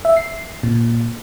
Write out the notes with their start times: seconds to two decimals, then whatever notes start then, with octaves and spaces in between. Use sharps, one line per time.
0.05 E5
0.17 C7
0.63 A#2